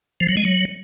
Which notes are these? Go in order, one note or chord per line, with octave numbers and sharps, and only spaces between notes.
F3
F#3
G#3
F#3